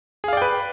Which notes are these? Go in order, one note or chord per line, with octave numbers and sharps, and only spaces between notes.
G#4 B4 D5 F5 G5